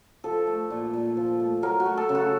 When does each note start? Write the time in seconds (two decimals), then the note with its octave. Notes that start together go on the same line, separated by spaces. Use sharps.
0.24 F3 A4
0.47 A3
0.70 A#2
0.93 A#2
1.17 F3
1.40 A3
1.62 F#3 A#4
1.80 F#4
1.86 A3
1.97 A4
2.09 C#3
2.15 F#4